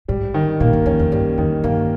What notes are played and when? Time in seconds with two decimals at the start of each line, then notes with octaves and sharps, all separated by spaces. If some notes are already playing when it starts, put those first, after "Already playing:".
0.08 G#2 G3
0.34 D#3
0.60 A#2 A#3
0.73 G2
0.86 E2 C#4
0.99 E2
1.12 G2 G3
1.38 E2 D#3
1.64 G2 A#3